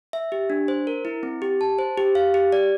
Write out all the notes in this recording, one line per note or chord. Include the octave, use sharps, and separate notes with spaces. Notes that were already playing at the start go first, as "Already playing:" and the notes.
E5
G4
D4
C5
A#4
E4
C4
G4
A5
C5
G4
F5
G4
D5